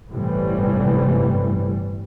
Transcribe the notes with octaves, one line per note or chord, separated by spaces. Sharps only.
G1 A2 C3 E3 G3